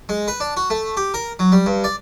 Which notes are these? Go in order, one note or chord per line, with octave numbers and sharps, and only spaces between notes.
G#3
B4
D4
F#4
A3
G4
A#4
F#3
G3
G2
D5